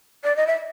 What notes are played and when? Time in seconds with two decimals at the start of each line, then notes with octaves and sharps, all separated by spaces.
0.24 D5
0.36 D#5
0.47 E5